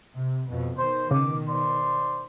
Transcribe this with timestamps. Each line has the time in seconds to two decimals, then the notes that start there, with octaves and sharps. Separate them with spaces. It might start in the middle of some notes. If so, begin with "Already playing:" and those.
0.14 C3
0.48 F2 B2
0.77 B2 D#3 C5
1.11 C#3 D6
1.49 C5 D5 C6